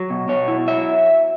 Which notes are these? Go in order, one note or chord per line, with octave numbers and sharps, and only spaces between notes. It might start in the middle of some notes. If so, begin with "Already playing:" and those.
Already playing: F#3
B2
B2 C#5
E4
F#3 E5